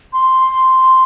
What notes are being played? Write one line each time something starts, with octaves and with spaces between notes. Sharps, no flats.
C6